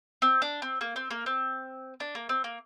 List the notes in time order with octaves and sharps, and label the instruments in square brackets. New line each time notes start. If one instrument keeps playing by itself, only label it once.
[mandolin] C4
D4
C4
A#3
C4
A#3
C4
D4
A#3
C4
A#3